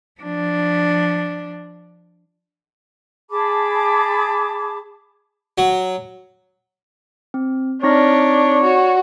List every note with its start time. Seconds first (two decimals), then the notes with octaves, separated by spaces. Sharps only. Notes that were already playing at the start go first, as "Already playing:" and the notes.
0.21 F3 D4
3.30 G#4 A5 B5 D6
5.58 F#3
7.34 C4
7.83 C4 D4 D#4 C#5 A#6
8.63 F#4